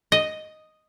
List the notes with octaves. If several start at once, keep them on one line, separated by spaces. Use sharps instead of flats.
D#5